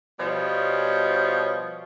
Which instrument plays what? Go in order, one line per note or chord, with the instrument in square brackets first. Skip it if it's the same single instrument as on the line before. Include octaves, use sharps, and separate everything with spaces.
[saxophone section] B2 F3 G3 B3 C#5 D#5